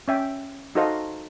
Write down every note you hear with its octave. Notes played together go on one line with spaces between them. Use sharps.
C#4 E5 G5
D#4 F#4 A4 C5 D#5 F5